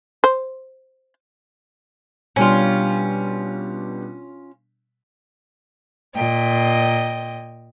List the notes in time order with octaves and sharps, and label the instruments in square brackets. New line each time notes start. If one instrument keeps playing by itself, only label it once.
[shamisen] C5
[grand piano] B2 G3 D4 [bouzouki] C#4 F4
[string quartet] A#2 D#5 G5